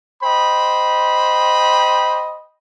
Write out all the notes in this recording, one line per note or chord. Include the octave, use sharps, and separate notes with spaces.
C5 D#5 G5 B5